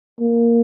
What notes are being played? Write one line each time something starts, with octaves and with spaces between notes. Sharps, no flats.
A#3